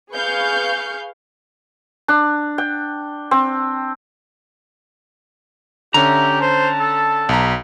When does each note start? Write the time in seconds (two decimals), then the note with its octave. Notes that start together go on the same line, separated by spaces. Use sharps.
0.11 G#4 B4 F5 C#6 G6
2.08 D4
2.58 G5
3.31 C4
5.94 D3 C#4 G4 E5 A#5
6.41 C5 A5
6.80 A4
7.29 B1 A#5